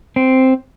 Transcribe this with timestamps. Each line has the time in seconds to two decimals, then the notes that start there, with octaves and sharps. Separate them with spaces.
0.16 C4